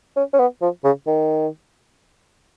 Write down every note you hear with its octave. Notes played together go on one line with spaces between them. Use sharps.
C#4
C#4
B3
F3
C#3
D#3